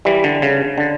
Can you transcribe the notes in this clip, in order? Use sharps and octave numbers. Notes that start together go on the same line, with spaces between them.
E3 G3
D3
C#3
D3